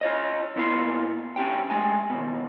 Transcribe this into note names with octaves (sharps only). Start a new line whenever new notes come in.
F4 C#5 D#5
A#2 B3 E4 F4 D5 C6
C#4 D4 G4 G5
G#3 A3 G#5
D#2 B2